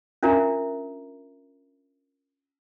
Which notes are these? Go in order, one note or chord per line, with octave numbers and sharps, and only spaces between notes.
C#4 D4 F4 A#4 E5 A#5